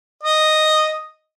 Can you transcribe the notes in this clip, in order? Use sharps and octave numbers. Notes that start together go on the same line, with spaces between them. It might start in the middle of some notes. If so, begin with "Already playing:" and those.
D#5